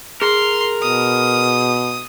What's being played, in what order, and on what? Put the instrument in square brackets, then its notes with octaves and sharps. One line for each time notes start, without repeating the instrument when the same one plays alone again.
[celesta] G#4 [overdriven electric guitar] A#4 [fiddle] C6
[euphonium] B2 [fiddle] D#6